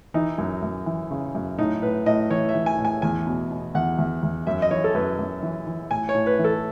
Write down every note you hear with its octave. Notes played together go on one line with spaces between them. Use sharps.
E3 D#4
F#2
F#2
E3
C#3
F#2
A2 D#4
A2 B4
A2 D#5
E3 C#5
E5
E3
G#5
A2
G#5
E2 G#5
B2
B2
E2 F#5
E2
E2
F#2 E5
D#5
E3 C#5
A4
F#2 B4
F#2
E3
E3
A2 G#5
C#5
A2
B4
E3
A4